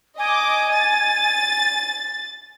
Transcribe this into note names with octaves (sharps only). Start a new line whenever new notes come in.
D#5 G#5 D6
A6